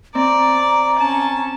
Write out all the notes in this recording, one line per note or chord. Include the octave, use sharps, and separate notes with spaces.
C4 D5 A#5
C#4 A5